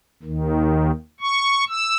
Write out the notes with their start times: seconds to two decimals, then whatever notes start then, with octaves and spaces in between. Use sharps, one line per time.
0.23 D#2 D#3
1.21 C#6
1.69 E6